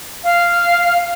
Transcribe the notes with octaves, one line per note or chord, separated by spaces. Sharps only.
F5